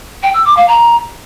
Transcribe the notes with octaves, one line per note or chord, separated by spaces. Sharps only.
G5
E6
D6
F5
A#5